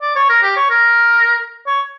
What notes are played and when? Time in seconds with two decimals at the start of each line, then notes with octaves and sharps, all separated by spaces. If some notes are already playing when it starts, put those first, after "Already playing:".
0.02 D5
0.15 C#5
0.29 A#4
0.42 G4
0.56 C#5
0.70 A#4
1.67 C#5